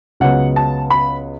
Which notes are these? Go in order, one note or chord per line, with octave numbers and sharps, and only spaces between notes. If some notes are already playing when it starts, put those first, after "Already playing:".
C#2 C#3 F#3 B3 F#5
A5
B5